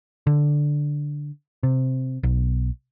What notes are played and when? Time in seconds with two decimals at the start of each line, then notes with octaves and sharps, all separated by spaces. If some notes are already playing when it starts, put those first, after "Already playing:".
0.27 D3
1.63 C3
2.23 B1